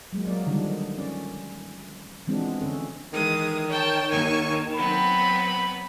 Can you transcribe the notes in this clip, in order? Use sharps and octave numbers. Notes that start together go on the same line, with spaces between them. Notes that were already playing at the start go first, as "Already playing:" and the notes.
F#3 G#3 A#3
F#3 A#3 D5
D3 D#3 F3 G3 G#3 D4
C#4 D5
E3 F3 G#3 B3 C4 D4
D3 C#4 A4
D#3 E3 G#3 D#6
C#5 G5 A5
D#2 G#5 C#6
F#3 B3 C4 B5